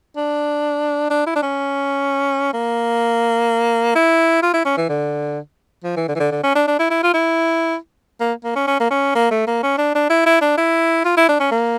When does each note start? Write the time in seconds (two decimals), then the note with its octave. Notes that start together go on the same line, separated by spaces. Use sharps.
0.16 D4
1.10 D4
1.27 E4
1.36 D4
1.43 C#4
2.54 A#3
3.95 E4
4.42 F4
4.54 E4
4.65 C#4
4.77 E3
4.89 D3
5.84 F3
5.97 E3
6.08 D3
6.16 E3
6.20 D3
6.32 D3
6.43 C#4
6.56 D4
6.68 D4
6.79 E4
6.90 E4
7.03 F4
7.14 E4
8.20 A#3
8.44 A#3
8.56 C#4
8.67 C#4
8.80 A#3
8.91 C#4
9.15 A#3
9.31 A3
9.47 A#3
9.63 C#4
9.78 D4
9.95 D4
10.10 E4
10.26 E4
10.41 D4
10.58 E4
11.05 F4
11.17 E4
11.29 D4
11.40 C#4
11.52 A#3